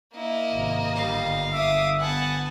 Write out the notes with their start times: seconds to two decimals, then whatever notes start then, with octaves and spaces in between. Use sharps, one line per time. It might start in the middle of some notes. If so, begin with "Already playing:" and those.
0.14 A#3 E4 D#5
0.51 G#1 C3
0.96 G1 D3 G3 F5
1.53 E5 D6 D#6
2.00 B3 F#5 G#5 A5